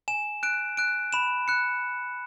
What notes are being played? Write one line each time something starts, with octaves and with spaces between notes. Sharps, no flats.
G#5 E7
F#6 D7
F#6 D7
B5 E7
F#6 C#7